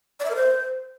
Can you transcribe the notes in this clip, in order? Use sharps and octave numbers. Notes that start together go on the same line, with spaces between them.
D5
E5
A#4
C5